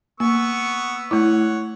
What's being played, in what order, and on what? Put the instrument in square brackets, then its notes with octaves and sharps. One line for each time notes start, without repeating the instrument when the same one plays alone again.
[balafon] A#3 [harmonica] B3 C#6 E6
[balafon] A3 E4 [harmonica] C#5 F#5